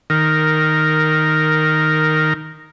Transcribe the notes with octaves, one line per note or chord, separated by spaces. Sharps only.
D#3 A#4